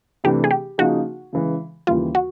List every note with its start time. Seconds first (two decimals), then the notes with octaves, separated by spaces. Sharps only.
0.24 C3 E3 A3 D4 G4
0.44 G#4
0.51 G4
0.78 C#3 F3 A#3 D#4 F#4 G#4
1.33 C#3 E3 G#3
1.87 D#2 C#3 E3 G3 A#3 F4
2.15 F#4